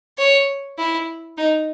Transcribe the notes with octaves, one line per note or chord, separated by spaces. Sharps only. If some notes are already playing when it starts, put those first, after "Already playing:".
C#5
E4
D#4